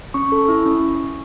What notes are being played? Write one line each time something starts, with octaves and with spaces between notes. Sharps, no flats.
C#4 C#6
A4
E4
C#4